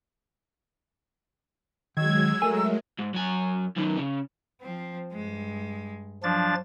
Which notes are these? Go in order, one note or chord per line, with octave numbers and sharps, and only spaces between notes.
D#3 F#3 G#3 E6 G#6
A3 A4 A#4 G#5
G#2
F#2 G#5
F#2 D#3
C#3
F3 C4
G2 G#3
F3 F#3 D4 A6